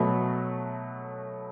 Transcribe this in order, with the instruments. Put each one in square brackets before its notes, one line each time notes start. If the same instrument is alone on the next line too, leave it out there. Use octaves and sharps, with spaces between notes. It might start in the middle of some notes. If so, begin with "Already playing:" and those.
Already playing: [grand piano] B2 F#3 A3